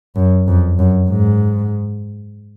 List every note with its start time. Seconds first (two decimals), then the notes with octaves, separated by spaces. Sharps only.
0.15 F#2
0.47 F2
0.79 F#2
1.09 G#2